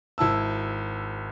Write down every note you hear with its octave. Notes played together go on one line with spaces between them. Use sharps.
G#1 E4 A5 E6